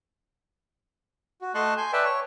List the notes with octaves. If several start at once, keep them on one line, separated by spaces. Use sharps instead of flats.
F#4
A3 D#5 A5 C6 C#6 F#6
G#5 C6 G6
B4 D5 E5 G5 A5
C#5 C#6